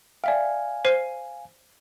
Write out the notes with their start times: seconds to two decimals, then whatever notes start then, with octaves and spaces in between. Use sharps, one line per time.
0.24 D5 E5 F5 G5 G#5
0.85 C5 F6 C7 D#7